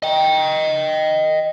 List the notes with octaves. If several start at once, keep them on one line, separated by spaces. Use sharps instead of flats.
D#5 G5